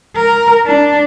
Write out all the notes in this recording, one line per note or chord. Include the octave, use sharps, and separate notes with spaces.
A#4
D4